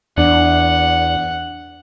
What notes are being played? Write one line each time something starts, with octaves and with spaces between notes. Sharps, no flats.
E2 D4 F#5